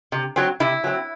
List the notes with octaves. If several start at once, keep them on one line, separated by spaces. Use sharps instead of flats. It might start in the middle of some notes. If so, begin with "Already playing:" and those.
C3
F#3 C4
C3 E4
F#3 C4